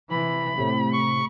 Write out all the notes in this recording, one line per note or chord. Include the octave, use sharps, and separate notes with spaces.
C3 E3 B5
A2 C3 A3
C#6